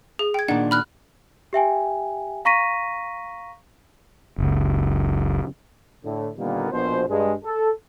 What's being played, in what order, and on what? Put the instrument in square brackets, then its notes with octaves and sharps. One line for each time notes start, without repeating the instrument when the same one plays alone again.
[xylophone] G#4
G5 G#6
[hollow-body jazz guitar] A#2 D#3 D4 [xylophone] F#5
[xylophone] B5 F6 F#6
[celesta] G4 E5 G5 G#5
F5 A#5 C#6 A#6 B6 D#7
[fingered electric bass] F#1 C#2
[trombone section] A2 D3
A#2 D3 D#3 G3 A#3 B3
A#1 B2 C5
G2 G#3
A4